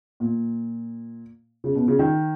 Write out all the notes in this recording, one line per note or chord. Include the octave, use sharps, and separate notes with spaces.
A#2
C#3
B2
C#3
D#3